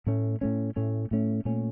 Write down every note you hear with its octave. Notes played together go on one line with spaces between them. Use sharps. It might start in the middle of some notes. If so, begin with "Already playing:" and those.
A2 A3 C#4
A2 A3 C#4
A2 A3 C#4
A2 A3 C#4
A#2 A3 C#4